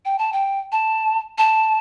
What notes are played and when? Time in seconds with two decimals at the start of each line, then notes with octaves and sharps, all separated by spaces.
0.05 G5
0.19 A5
0.33 G5
0.72 A5
1.38 A5